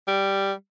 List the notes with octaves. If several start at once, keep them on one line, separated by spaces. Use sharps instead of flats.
G3